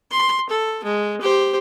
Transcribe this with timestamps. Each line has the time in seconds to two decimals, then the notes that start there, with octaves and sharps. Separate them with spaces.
0.11 C6
0.49 A4
0.84 G#3
1.21 G4 C5